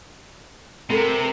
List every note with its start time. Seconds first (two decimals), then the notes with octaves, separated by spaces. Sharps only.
0.90 C3 B3 A4 A#4